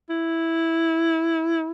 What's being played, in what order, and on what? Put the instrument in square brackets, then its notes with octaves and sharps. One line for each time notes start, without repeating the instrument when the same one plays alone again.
[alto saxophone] E4